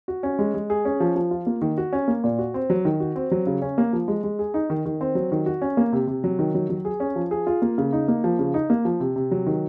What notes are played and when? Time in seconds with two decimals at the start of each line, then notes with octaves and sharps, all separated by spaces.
0.08 F#4
0.23 C#4
0.39 G#3
0.54 G#3
0.70 G#4
0.85 C#4
1.00 F3
1.16 F3
1.31 F4
1.46 A#3
1.62 D#3
1.78 F#4
1.93 C#4
2.08 A#3
2.24 A#2
2.39 F#4
2.54 C4
2.70 F#3
2.85 D#3
3.00 F#4
3.16 C4
3.31 F#3
3.47 C#3
3.62 C#4
3.78 A#3
3.93 F3
4.08 G#3
4.24 G#3
4.39 G#4
4.54 D#4
4.70 D#3
4.86 D#3
5.01 C4
5.15 F#3
5.32 D#3
5.46 F#4
5.62 C#4
5.77 A#3
5.93 C3
6.07 C3
6.24 F#3
6.39 D#3
6.54 F#3
6.70 F#3
6.85 G#4
7.00 C#4
7.16 F3
7.31 G#4
7.47 F4
7.62 A#3
7.78 C#3
7.93 D#4
8.08 A#3
8.24 F3
8.39 C#3
8.54 D#4
8.70 A#3
8.85 F3
9.00 C3
9.16 C3
9.31 F#3
9.46 D#3